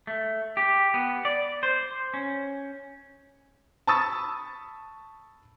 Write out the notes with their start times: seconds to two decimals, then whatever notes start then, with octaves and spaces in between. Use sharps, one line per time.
0.07 A3
0.57 G4
0.94 B3
1.25 D5
1.63 C5
2.14 C#4
3.87 A5 B5 C#6 D#6 E6 A6